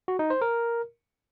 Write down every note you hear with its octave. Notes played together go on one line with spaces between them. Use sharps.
F#4
D#4
C5
A#4